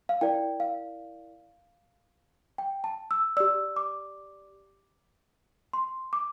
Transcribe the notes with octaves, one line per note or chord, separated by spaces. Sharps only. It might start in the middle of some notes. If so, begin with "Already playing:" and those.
F5
E4 A#4 D5 G5
F5
G5
A5
E6
G4 D5 E6
D6
C6
D6